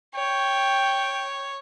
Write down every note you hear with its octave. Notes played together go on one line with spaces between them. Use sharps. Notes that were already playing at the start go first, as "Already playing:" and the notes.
C#5 G5